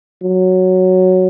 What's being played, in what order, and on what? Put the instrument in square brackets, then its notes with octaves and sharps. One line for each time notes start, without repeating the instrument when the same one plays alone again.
[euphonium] F#3